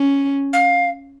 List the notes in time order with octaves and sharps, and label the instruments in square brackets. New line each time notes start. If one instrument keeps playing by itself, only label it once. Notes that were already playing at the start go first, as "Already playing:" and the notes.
Already playing: [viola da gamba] C#4
[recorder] F5